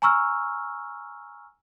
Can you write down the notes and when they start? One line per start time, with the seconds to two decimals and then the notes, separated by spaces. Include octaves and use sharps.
0.02 G#5 A#5 C#6 E6 F6